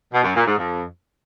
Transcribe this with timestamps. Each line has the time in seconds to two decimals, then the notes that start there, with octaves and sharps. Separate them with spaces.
0.12 B2
0.24 F#2
0.35 A#2
0.46 G#2
0.58 F2